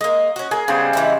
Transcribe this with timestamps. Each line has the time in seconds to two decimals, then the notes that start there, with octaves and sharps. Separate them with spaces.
0.01 G#3 A#3 D#5
0.36 C#4 F#4
0.51 A#3 G#4
0.68 C#3 G3 B3 C5
0.93 E3 D#4 E4